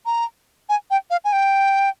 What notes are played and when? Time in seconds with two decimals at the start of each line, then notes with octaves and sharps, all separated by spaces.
0.06 A#5
0.69 G#5
0.91 G5
1.10 F5
1.24 G#5
1.33 G5